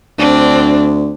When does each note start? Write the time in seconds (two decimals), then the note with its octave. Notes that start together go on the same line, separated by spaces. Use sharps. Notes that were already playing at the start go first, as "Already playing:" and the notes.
0.19 D2 C4 D4